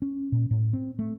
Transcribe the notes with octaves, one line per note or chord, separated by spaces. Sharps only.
C#4
A#2
A2
C4
A3